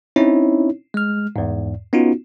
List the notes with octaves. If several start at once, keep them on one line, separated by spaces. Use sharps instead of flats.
C4 C#4 D#4 E4 C#5
G#3 F6
E2 G#2
B3 C#4 D#4 F4 F#4